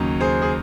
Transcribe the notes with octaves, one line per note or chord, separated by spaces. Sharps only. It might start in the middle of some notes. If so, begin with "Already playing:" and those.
Already playing: D#2 C#3 F#3
G#4 C5
G#4